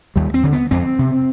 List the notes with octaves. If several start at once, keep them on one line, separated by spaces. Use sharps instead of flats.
D#2 G3
C4
D3
B3
F2 C4
C3